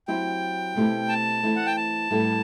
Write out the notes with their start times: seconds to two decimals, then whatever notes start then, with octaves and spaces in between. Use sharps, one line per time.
0.08 F#3 C4 E4 G4 G5
0.75 B2 A3 C4 E4 G4
1.09 A5
1.43 E3 A3 C4 E4
1.56 F#5
1.66 G5
1.77 A5
2.11 A2 G3 B3 E4 A4